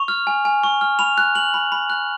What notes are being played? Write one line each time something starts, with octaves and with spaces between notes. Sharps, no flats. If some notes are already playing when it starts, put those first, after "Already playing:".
Already playing: C#6 F7
F6
G#5
G#5
C#6
F6
B5 F7
F#6
F#6 F#7
B5
B5
F#6